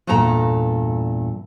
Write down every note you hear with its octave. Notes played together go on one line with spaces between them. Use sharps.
E2 G2 A#2 A4 A#5